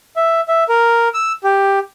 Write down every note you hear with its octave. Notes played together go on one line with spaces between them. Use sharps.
E5
E5
A#4
E6
G4